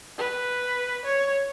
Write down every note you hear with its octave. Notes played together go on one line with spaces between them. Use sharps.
B4
C#5